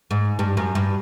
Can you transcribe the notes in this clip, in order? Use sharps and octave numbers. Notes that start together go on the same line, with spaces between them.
G#2
G2
F#2
G2